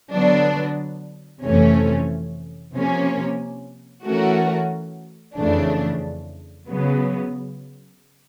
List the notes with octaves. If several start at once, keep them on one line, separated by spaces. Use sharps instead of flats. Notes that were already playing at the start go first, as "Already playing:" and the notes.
D3 F#3 B3 D4
F2 C3 E3 A3 C#4
C3 F3 A#3 C#4
E3 A3 C#4 F#4 A#4
F2 C#3 E3 A3 D4
C#3 F#3 B3